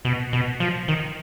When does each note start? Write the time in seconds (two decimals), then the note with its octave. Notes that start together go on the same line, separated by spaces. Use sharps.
0.05 B2
0.33 B2
0.60 F3
0.88 D#3